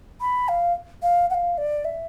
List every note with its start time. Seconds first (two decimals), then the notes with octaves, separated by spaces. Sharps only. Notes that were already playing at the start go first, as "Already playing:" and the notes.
0.21 B5
0.49 F5
1.03 F5
1.30 F#5
1.34 F5
1.58 D5
1.85 E5